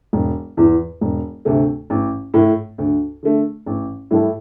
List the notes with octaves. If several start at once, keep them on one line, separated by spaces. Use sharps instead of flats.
E1
E2 E3
E1
D2 C3 A3
A1
A2 A3
D2
D3 A3
A1
A2 G3 E4 A4